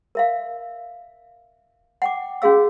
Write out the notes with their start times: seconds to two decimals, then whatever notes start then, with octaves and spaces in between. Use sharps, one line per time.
0.15 A#4 E5 F5
2.02 F#5 G5 D6
2.42 C#4 F#4 G#4 F5 E6